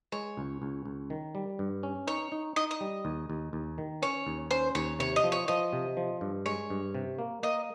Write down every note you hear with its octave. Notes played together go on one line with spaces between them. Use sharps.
G#3 C#5
C#2
C#2
C#2
D#3
G3
G2
C#4
D#4 C#5
D#4
D#4 D#5
D#5
G3
D#2
D#2
D#2
D#3
C#4 C#5
D#2
C#4 C5
D#2 C#5
C3 C#5
D#5
F3
C#5
F3 D#5
C3
F3
G2
G#3 C#5
G2
C3
A#3
A#3 D#5